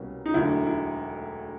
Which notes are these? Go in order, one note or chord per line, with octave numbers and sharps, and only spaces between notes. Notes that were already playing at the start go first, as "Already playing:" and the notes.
Already playing: C2 B2 G3 A#3 C#4
D#4
E1 D2 D3 F#3 E4
E4